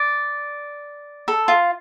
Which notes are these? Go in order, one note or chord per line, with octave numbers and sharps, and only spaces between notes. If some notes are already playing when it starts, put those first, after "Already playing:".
Already playing: D5
A4
F4